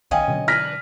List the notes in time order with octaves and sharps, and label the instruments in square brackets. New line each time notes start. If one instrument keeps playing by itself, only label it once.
[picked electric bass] B1 D#3 [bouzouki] C#4 D#5 [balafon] F5 G5 G#5
[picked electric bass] B2 D3 F#3
[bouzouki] E3 D4 B4 [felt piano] F6 A#6 B6